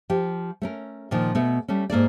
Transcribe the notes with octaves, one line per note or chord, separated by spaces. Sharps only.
F3 G4
A3 C#4 A#4
A#2 D#3 F3
B2 A3 B3
G3 A3 C#4
G#2 A#3 A4 D5